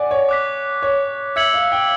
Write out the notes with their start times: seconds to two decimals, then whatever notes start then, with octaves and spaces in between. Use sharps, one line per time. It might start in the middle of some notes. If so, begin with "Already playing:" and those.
Already playing: D5 F#5 G#5
0.11 C#5
0.29 D6 F#6 B6
0.82 C#5
1.36 E5 E6 G#6 C#7 F#7
1.54 F5
1.72 G5